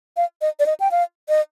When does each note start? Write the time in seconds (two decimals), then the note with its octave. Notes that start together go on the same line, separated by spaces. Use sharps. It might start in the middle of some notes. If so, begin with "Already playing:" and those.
0.17 F5
0.41 D#5
0.59 D5
0.66 D#5
0.80 G5
0.91 F5
1.29 D#5